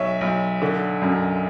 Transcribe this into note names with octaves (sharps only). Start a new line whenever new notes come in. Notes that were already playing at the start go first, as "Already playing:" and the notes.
Already playing: B1 C#5 E5
B1
D3
F#2